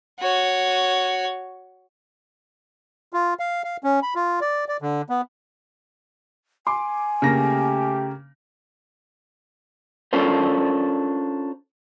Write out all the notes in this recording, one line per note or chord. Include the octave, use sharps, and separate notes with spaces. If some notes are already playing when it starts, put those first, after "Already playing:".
F#4 C#5
F4
F5
F5
C#4
B5
F4
D5
D5
D3
B3
G#5 C6 D6
C#3 A3 A#3 G4 A#6
C#4 D4 F4 A4 A#4 C5